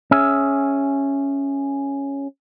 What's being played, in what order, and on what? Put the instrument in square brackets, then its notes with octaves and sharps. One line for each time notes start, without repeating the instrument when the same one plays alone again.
[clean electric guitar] C#4 G#4 E5